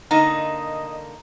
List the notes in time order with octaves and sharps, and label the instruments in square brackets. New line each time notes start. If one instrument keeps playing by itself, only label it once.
[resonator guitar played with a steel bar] D3 A#3 D#4 [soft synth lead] D#5 [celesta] A#5